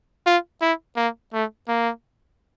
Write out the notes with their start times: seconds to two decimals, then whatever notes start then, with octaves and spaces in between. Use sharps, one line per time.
0.26 F4
0.62 E4
0.96 A#3
1.33 A3
1.68 A#3